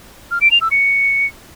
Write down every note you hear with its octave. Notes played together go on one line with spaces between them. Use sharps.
F6
D7
F7
E6
C#7